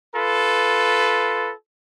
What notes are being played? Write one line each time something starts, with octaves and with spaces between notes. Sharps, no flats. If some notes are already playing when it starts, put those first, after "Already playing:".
F4 A4 B4